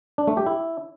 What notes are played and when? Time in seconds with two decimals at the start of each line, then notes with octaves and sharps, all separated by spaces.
0.18 D4
0.27 A3
0.37 G4
0.46 E4